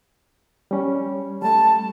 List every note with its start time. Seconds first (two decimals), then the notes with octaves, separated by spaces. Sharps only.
0.71 G3 C#4
1.42 G3 A3 A5